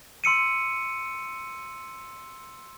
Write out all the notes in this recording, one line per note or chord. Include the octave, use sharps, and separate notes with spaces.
C6 E6 C#7 D#7